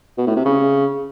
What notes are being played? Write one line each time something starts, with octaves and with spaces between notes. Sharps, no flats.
B2
A2
C3
C#3